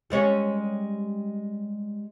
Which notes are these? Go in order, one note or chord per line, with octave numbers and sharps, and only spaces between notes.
G3 G#3 C#4